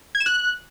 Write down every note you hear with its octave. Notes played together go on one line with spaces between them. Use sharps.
G#6
E7
F#6